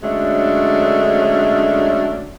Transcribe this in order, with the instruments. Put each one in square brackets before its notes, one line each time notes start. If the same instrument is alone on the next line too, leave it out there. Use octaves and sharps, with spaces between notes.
[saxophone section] D3 F#3 G#3 A3 C#4 D4